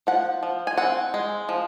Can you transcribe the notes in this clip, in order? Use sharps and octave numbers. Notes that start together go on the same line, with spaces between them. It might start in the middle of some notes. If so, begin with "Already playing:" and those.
F3 F#5
F3
G#5
C4 F#5
G#3
F3